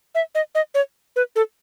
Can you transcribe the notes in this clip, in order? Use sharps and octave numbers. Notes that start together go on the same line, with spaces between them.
E5
D#5
D#5
C#5
B4
A4